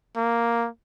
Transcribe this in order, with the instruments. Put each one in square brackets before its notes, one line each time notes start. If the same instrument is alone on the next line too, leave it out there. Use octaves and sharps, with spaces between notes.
[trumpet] A#3